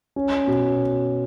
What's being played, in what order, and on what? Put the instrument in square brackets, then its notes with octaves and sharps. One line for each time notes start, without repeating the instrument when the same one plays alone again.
[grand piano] C#4
B2